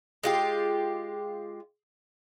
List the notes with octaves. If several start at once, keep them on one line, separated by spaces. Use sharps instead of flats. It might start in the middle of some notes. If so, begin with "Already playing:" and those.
G#3 F4 G4